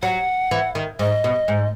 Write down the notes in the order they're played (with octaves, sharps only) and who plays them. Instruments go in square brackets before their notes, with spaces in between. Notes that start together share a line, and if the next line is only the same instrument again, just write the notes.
[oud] F#3 [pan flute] F#5
[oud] E3
D#3
[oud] G#2 [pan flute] D#5
[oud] B2
G#2